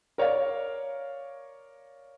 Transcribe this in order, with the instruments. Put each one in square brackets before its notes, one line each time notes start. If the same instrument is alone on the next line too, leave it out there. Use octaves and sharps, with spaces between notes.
[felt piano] A#4 C#5 D5 F5